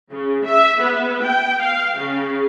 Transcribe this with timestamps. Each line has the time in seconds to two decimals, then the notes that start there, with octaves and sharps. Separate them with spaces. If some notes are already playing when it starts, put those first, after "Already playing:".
0.11 C#3
0.45 E5
0.81 B3
1.23 G5
1.62 F5
1.99 C#3